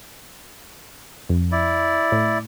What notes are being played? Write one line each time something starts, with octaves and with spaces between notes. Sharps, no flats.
F2
E4 D5
A2